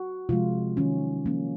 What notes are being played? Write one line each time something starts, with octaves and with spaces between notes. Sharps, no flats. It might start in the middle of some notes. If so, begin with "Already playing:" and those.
Already playing: F#4
C3 F3 G#3 F4
D#3 F#3 C#4
F3 A#3 C#4